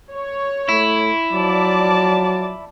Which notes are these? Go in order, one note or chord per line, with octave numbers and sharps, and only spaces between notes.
C#5
A3 E4
F3 F#3 D5 A5